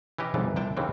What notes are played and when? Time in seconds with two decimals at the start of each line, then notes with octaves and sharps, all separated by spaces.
0.18 E3 C#4 G4 D#5
0.34 G1 C2 F2 G#2 E3 D5
0.56 C2 C3 G5 A5
0.77 D#2 C#3 E3 C4